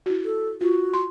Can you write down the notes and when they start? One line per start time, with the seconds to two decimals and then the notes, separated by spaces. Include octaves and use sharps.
0.06 E4 F#4
0.25 A4
0.61 F4 F#4
0.93 C6